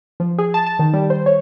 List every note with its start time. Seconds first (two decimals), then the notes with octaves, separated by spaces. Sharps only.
0.20 F3
0.39 G#4
0.54 A5
0.67 A5
0.79 D#3
0.94 G3
1.10 C5
1.26 C#5